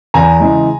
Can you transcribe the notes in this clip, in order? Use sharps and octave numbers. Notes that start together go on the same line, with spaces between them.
E2 G#5 A#5
C#3 E3 G#3